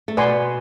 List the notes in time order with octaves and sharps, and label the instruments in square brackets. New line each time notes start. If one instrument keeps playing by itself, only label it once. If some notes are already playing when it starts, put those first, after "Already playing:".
[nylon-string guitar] A3
[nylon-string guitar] B2 B3 [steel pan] B4 D5 G#5 C6